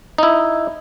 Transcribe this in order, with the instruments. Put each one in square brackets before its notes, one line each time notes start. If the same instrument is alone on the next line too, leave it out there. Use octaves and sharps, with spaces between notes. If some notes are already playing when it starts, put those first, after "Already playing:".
[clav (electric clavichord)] D#4 E4